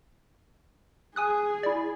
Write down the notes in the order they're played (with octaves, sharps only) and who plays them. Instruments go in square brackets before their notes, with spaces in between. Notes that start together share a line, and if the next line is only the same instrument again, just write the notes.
[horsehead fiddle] G#4 [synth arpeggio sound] G#5 D#6 F#6
[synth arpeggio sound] E4 D5